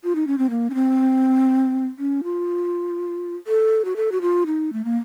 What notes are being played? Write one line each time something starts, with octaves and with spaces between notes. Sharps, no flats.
F4
D#4
C#4
C4
A#3
C#4
C4
C#4
F4
A4
F#4
A4
F#4
F4
D#4
A3
A#3